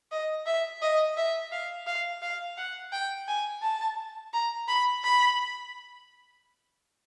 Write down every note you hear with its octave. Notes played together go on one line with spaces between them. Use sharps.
D#5
E5
D#5
E5
F5
F5
F5
F#5
G5
G#5
A5
A#5
B5
B5